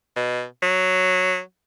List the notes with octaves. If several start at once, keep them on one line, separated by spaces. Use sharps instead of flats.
B2
F#3